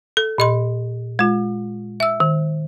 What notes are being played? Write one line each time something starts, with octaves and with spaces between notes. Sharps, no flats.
A4
A#2 D#5 C6
G#3 F4
E5 E6
D#3